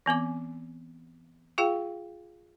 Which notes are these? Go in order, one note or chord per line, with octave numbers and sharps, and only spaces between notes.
E3 B3 C4 D6
F4 G#4 F5 G5